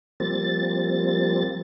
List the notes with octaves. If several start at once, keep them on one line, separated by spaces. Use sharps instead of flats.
F3 G3 A#3 C4 A6